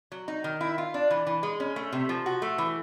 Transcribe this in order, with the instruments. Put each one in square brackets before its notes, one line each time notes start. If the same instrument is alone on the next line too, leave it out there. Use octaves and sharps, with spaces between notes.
[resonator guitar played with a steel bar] F#3
D#4
D#3
E4
F4
D4
E3
E3
G#3
C#4
A3
C3
F3
F#4
A3
E3